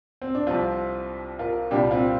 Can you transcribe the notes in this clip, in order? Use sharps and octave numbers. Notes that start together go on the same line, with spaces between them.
C4
D4
C2 C3 F3 C4 F4
F4 A#4
C2 A#2 G3 D4 G4
C4 F4